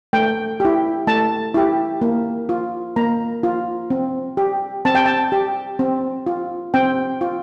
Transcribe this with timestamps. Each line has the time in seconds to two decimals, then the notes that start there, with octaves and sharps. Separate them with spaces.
0.13 A3 G5
0.60 E4 G4
1.07 A3 A5
1.54 E4 G4
2.01 A#3
2.49 F4
2.96 A#3 A#5
3.43 F4
3.90 C4
4.37 G4
4.85 C4 A5
4.95 G5
5.06 A5
5.32 G4
5.79 C4
6.26 F4
6.74 C4 G5
7.21 F4